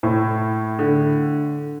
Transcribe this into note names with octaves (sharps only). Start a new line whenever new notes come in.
A2
D3